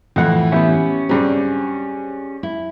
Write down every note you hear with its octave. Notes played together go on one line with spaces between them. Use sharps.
F2 A2 E3 F#5
B3 C#4 E4 G4 G6
G2 C#3 F#3 C4
E4